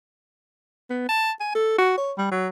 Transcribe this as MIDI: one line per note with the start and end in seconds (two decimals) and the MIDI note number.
0.90 1.05 59
1.09 1.32 81
1.40 1.52 80
1.55 1.75 69
1.78 1.96 66
1.98 2.13 73
2.18 2.28 55
2.32 2.49 54